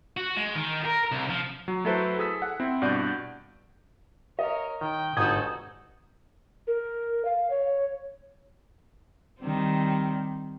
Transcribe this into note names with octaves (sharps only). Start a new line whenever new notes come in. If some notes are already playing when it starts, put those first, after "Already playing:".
F#4
G#3
D#3
A#4
C2
F3
F#3
F#3 A3 E4 A4 B4 C5
G#4 A4 E6 B6
F#5
C4 E4
G2 B2 D5 F#5 G6
A#4 C#5 D#5
D#3 G5
G1 G#2 F#4 A4 D#6 G6 G#6
A#4
F5
C#5
D#3 G3 C4